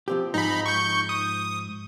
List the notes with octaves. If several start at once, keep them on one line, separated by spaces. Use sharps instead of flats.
F3 C4 G4
G#2 F3 D#4 B5
C#6 G6
D#6